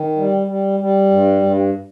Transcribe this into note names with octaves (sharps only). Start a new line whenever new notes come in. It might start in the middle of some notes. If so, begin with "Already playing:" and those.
Already playing: D#3
G3
G3
G3
G2
G2